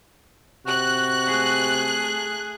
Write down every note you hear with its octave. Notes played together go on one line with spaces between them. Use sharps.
C3 F#4 F#6
A3 G#4